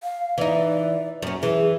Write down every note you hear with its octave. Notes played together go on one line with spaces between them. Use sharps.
F5
E3 D#4 D5
F#2 C#4
E3 G#4